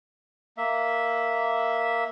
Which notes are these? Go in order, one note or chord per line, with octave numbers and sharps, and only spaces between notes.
A#3 E5